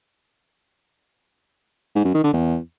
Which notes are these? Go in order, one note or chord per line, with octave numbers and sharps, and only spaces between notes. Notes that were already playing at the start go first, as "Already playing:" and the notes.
G#2
F#2
D#3
D3
E2